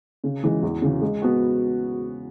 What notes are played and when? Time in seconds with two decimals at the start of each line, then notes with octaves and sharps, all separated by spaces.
0.24 C#3
0.43 E3 G#3
0.63 E2
0.82 C#3 E3
1.02 G#3
1.22 B3 F#4